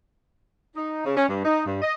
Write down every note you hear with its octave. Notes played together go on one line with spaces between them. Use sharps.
D#4
C#3
C#4
G2
D#4
G2
D#5